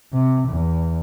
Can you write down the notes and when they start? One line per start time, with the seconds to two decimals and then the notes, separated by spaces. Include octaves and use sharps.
0.13 C3
0.49 E2